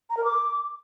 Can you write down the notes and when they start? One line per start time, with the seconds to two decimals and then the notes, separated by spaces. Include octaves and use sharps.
0.10 A#5
0.17 A#4
0.24 D6